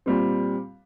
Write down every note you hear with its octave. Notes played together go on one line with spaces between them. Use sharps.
A#2 G3 C4